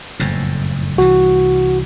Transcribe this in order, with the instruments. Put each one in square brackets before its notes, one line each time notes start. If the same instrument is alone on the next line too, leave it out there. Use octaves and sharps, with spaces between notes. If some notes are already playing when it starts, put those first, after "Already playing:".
[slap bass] F#1 F2 A2
[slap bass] C2 E3 [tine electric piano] F#4